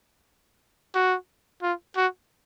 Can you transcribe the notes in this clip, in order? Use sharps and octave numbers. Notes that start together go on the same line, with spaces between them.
F#4
F4
F#4